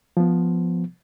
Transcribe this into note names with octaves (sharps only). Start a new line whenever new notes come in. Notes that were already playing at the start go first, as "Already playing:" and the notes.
F3 B3